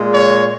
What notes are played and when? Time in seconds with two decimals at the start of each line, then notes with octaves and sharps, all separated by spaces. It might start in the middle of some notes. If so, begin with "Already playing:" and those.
Already playing: A#2 G#3
0.13 C#5